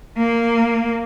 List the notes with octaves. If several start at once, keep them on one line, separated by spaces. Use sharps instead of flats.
A#3